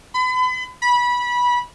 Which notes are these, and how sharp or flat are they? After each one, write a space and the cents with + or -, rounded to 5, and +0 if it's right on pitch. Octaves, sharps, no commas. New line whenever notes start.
B5 +40
B5 -20